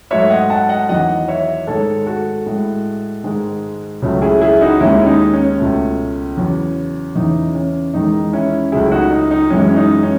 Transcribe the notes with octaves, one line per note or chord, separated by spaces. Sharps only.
G#2 F#3 A3 C#5 E5
D#5 F#5
F#5 A5
D#5 F#5
E2 D#3 F#3 D#5 F#5
C#5 E5
G#2 D#3 G#3 A4 C#5
F#4 A4
A2 G#3
G#2 D#3 G#3
C#2 C#3 F#3 A3
E4 G#4
E4 G#4
D#4 F#4
D#2 D#3 G#3 C#4 E4
C#4
D#4
C#4
C#2 B2 A3
E2 C#3 F#3
E2 C#3 E3 D#4
C#4
E2 D#3 G#3 D#4
C#4 E4
C#2 C#3 F#3 A3 E4 G#4
E4
D#4 F#4
D#4
D#4
F#2 E3 G#3 C#4
C#4
D#4
C#4